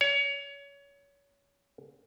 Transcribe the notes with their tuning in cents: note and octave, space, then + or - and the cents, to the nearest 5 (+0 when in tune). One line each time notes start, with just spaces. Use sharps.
C#5 +25